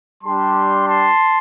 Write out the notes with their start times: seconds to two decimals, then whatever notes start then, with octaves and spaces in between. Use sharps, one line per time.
0.22 G3 D4 G4 A5 C6
0.86 A5 C6